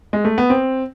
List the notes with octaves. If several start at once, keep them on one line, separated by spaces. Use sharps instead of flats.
G#3
A3
B3
C4